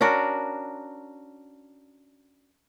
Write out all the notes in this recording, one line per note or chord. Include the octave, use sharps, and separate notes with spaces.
C#4 D4 F#4 A#4